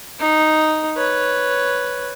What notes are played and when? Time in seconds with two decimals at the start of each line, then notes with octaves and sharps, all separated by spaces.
0.20 D#4
0.97 B4 C#5